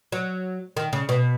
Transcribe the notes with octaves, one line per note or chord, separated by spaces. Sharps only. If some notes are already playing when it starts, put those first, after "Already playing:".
F#3
D#3
C#3
B2